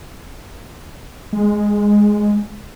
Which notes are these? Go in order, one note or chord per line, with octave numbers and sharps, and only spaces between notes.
G#3